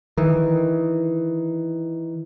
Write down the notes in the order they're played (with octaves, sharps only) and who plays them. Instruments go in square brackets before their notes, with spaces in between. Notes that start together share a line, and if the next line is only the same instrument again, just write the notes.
[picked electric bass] D#3 E3